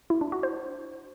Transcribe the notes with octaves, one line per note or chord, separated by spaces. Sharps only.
E4
D4
F#4
C5